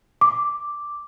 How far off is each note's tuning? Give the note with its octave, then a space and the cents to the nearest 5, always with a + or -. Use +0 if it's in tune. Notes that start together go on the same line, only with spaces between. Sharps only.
D6 +0